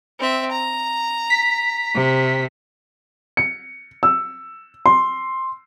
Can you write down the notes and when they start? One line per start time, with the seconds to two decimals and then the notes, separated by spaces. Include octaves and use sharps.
0.19 C4 E5
0.51 A#5
1.30 B6
1.95 C3
3.37 C#7
4.03 E6
4.86 C6